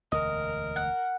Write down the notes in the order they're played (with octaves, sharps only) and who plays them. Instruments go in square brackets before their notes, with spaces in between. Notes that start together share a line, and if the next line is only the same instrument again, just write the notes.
[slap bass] E1 D2 [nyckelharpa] A#4 [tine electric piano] D#5 D#6
[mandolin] F#5